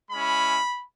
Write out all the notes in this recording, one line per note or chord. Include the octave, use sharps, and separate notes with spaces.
G#3 C#4 E4 B5